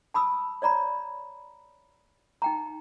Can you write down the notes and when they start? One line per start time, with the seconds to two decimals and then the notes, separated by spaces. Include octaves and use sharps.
0.14 A5 B5 D#6 E6
0.62 C#5 D5 A#5 B5
2.42 D#4 G5 A#5